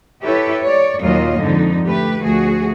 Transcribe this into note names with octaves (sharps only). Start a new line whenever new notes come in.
E4 G4 A4 B4 C#5 E5
C#5 D5
D#2 A#2 F#3 A#3 F4 D#5
F2 G#2 D3 D#4
A3 G4 B4
D2 F3 A3 F#4 G#4